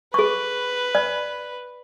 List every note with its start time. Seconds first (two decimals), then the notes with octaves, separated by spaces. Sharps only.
0.14 G#4 B4 C#6
0.95 D5